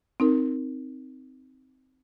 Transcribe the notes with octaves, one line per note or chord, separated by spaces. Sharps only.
C4 D#4 A#4